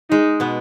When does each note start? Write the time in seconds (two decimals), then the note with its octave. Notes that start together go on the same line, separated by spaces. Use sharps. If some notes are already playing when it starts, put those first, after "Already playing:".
0.10 G#3 D#4
0.40 B2 B3